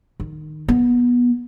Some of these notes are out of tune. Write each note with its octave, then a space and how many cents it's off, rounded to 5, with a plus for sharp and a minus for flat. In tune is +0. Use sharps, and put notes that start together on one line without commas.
D#3 -20
B3 -20